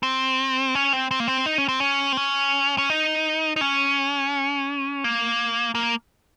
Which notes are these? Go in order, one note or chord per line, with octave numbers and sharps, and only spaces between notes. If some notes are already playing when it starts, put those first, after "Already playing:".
C4
C#4
C4
C4
A#3
C4
D#4
C#4
C4
C#4
C4
C#4
C#4
D#4
D#4
C#4
A#3
A#3